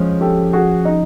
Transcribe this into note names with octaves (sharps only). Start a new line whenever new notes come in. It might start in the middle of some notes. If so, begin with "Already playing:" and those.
Already playing: F3 G#3 C#4
G4 A4
F#4 G#4
D#4